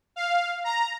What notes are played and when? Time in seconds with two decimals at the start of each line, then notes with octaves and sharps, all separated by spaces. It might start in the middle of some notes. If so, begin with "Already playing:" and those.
0.16 F5
0.64 A#5